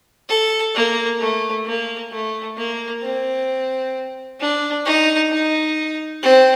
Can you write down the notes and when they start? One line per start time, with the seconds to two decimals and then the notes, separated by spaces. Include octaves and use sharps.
0.29 A4
0.75 A#3
1.20 A3
1.66 A#3
2.12 A3
2.58 A#3
3.02 C4
4.40 D4
4.86 D#4
5.32 D#4
6.23 C4